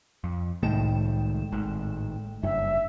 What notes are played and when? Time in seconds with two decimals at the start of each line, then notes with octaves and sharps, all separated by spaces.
0.24 F2
0.63 C2 A2 D#3 G#3 A3 G5 E7
1.52 G#1 G#2
2.43 F#1 G2 E5